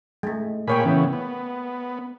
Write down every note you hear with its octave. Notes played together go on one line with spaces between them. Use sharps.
G#3 A3
A#2 A#3 G#4 C#5 G5 B5
C#3 E3 B3
B3